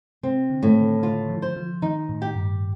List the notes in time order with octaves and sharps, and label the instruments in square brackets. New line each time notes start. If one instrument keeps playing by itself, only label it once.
[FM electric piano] C3 [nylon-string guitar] C4
[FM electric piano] D3
[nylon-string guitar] A2 [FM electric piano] D#3
[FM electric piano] D3
[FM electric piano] D3 [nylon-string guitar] F4
[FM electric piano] F3
[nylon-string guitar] C5
[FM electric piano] F3
[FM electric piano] D#3 [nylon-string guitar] D#4
[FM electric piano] A2
[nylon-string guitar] G4
[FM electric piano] G2